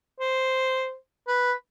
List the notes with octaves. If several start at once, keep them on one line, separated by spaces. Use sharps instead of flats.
C5
B4